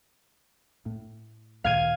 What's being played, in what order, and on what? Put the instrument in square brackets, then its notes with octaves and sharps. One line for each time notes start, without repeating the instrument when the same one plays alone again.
[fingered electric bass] A2
[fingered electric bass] D2 A#2 D#3 [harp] F5 G#6 D#7